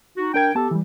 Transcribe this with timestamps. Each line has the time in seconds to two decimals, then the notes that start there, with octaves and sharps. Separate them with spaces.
0.17 D#4 F#4
0.34 D4 A#4 G5 G#6
0.55 B3 G4 A4 A5
0.71 E3 G3